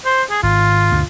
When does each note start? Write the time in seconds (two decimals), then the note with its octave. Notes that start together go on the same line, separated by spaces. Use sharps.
0.05 C5
0.31 G#4
0.43 G#1 F4
0.92 D2 G2 B2